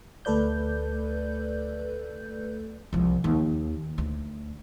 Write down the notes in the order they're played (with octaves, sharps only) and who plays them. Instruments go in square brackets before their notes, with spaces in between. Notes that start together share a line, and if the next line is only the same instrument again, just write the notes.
[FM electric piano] D2 A3 A4 B4 D5 G6
[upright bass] C2 F3
D#2
D2